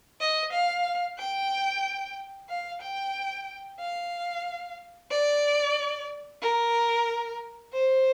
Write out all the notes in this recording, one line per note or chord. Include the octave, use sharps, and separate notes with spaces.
D#5
F5
G5
F5
G5
F5
D5
A#4
C5